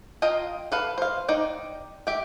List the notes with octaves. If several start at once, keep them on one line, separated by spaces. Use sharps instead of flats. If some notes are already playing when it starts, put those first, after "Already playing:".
F4 D#5 F5 G5 A#5
A4 B4 F5
C5 F5
D#4 D5 G5
G4 E5 G5